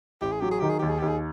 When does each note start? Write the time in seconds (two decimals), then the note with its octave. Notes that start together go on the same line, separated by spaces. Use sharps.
0.21 A1 G4
0.32 G#4
0.40 F#3 G4
0.51 G#4
0.60 D#3 G4
0.69 G#4
0.79 D#2 G4
0.89 G#4
0.99 D#2 G4
1.08 G#4